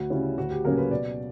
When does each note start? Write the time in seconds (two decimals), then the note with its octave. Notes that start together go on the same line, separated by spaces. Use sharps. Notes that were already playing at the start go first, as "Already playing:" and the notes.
Already playing: D2 F#4
0.10 C#3 G3 C#4 E4
0.38 D2 F#4
0.51 G4
0.64 C#3 F#3 A#3 C#4 A#4
0.77 B4
0.91 B2 D5